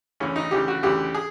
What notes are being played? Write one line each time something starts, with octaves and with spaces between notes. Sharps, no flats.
D2 C#3 E3 C#4
D#4
D2 C#3 E3 G4
F#4
D2 C#3 E3 G4
G#4